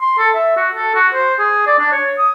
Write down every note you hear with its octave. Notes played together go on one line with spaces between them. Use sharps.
C6
A4
E5
F#4
A4
F#4
C5
G#4
D5
D4
C#5
D#6